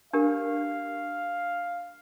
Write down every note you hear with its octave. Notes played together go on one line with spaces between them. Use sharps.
D4 G4 A#4 F5